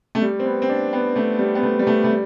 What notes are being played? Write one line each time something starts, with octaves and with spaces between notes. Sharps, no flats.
A3
G3
C4
B3
C4
D4
B3
A3
G3
B3
A3
G3
A3
A3
G3